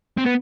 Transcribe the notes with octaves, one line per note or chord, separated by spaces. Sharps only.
C4
B3